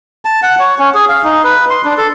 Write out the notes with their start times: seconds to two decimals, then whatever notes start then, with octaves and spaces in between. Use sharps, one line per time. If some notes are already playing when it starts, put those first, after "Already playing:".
0.25 A5
0.42 F#5
0.59 C#5
0.79 C#4
0.94 G#4
1.09 F5
1.24 D#4
1.44 B4
1.70 C6
1.85 D4
1.98 A4